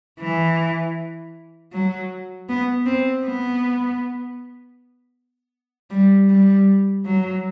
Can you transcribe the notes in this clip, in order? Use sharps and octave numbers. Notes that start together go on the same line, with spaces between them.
E3
F#3
B3
C4
B3
G3
G3
F#3